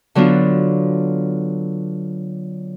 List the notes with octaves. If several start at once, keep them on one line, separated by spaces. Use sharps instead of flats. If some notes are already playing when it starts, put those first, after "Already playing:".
D3 F#3 B3 D4 F4